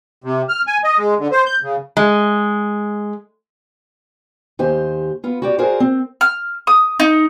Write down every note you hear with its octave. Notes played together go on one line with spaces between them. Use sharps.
C3
F6
G#5
D#5
G#3
D3
C5
G6
C#3
G#3
D#2 G4 C5 G#5
B3 F4
F#4 G4 D5
F4 F#4 G#4 A#4 C5 D5
C4
F6
D#6
D#4